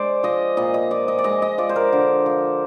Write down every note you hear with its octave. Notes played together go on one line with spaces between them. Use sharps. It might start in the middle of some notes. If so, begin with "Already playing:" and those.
Already playing: G#3 C5 D5
F3 D#5
A#2 D#5
D#5
F3 D5
D#5
D5
G#3 D#5
D#5
F3 D5
C5
A#4
D3
F3